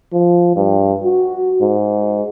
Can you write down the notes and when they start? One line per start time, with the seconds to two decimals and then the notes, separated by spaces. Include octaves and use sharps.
0.13 F3
0.56 G2
1.04 F#4
1.62 G#2